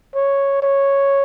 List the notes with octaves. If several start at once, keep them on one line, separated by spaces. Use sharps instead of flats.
C#5
C#5